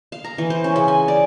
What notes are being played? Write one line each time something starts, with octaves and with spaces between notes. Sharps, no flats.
F5
A#5
E3
C5
C#4
C#3
G#5
D5